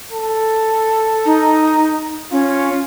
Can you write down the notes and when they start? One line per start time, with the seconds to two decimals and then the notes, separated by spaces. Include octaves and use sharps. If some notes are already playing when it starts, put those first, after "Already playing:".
0.12 A4
1.26 D#4
2.32 C#4 F4